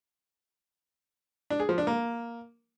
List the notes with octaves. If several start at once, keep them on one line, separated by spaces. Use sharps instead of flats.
D4
G#4
F3
D4
A#3